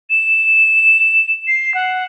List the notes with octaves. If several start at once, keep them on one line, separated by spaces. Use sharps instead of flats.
E7
C7
F#5